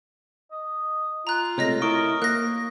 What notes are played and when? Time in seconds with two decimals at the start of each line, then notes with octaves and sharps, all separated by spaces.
0.52 D#5
1.27 F4 A#5 F#6
1.58 C3 G#3 A3 C#5 D#5 A#6
1.82 E4 A#4 C#6 D#6 D7
2.22 A#3 F#6 A#6